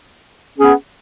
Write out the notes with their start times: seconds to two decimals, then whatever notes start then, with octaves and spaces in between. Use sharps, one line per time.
0.56 C#4
0.59 G#4
0.62 B3